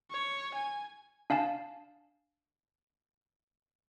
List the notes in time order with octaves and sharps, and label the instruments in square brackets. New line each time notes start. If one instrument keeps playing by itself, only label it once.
[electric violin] C#5
G#5
[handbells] D4 F5 G#5 A5